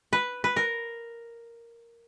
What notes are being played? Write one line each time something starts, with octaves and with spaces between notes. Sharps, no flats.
B4
B4
A#4